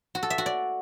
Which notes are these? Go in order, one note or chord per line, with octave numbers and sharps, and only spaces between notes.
F#4
A4
E5
F#4
D5